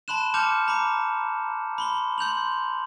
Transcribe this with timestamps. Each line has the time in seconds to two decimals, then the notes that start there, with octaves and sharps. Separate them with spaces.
0.08 A5 B5 C6 F#6 E7
0.34 A5 D6 F6 G6 C#7 F7
0.68 A#5 B5 D6
1.78 B5 C6 G7
2.18 C6 G6 F7 F#7